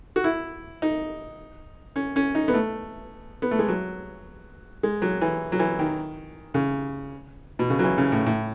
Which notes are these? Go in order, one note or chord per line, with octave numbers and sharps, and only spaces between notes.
F#4
E4
D#4
C#4
C#4
D#4
B3
A3
B3
A3
G#3
F#3
G#3
F#3
E3
F#3
E3
D#3
C#3
B2
C#3
F#3
E3
C#3
A2
A2